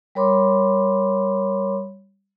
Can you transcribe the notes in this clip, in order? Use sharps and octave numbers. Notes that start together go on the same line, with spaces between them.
G3 A#4 C#5 B5 C6 D6